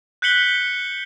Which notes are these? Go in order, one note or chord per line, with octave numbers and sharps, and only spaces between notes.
F#6 G6 B6 C#7 F#7 G7